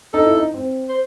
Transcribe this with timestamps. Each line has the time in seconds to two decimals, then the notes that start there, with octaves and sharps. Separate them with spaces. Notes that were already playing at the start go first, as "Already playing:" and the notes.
0.13 D#4 A4
0.25 E4
0.36 D#4
0.54 C4
0.89 C5